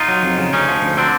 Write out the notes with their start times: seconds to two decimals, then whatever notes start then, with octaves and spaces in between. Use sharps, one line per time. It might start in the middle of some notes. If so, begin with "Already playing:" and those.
Already playing: D#4 F4
0.08 F#3
0.23 F2
0.38 C#3
0.53 D2 C#4 D#4
0.68 F3
0.82 D2
0.98 D3 C4 D4